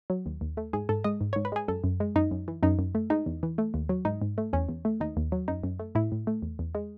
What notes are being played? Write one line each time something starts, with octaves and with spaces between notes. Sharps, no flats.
F#3
D#2
D#2
A3
G#2 G#4
G#2 A4
G#3 D#5
G#2
C#5
G#2
B4
G#3 G#4
F#2 A4
F#2
G#3
F#2 D#4
F#2
E3
F#2 D#4
F#2
A3
G#3 D#4
E2
E3
A3
D#2
F#3
G#2 D#4
G#2
A3
E2 C#4
E2
A3
D#2 D#4
D#2
F#3
F#2 D#4
F#2
A3
A2 E4
A2
A3
E2
E2
G#3